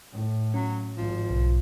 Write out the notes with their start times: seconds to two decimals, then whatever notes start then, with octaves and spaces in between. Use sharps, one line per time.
0.12 A2
0.54 F#3 C#4
0.97 G#1 F3
1.30 B1